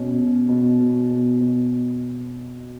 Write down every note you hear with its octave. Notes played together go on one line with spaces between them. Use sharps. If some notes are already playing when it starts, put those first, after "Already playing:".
Already playing: B2 C#4
B2
B2
B2
B2
B2